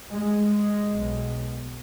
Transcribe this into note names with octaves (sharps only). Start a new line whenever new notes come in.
G#3
B1 B2